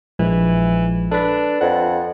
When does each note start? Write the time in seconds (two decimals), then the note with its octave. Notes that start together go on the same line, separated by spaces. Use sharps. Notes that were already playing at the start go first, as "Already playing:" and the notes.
0.19 A#1 E3 F3 G#3
1.11 D4 A4 B4 B5
1.61 F2 F#5